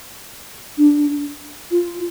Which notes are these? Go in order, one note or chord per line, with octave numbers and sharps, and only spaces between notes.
D4
F4